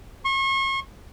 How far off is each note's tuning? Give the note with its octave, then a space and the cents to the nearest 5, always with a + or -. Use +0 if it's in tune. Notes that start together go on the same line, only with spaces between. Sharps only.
C#6 -40